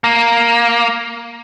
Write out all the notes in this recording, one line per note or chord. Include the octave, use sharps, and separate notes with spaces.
A#3